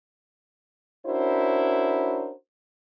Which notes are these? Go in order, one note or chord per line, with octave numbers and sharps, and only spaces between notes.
C#4 D4 E4 F#4 A#4 C5